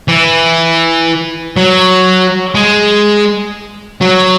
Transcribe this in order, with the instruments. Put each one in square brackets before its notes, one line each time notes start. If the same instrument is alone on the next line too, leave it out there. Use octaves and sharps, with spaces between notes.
[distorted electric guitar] E3
F#3
G#3
F#3